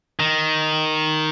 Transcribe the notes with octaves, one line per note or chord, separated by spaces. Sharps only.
D#3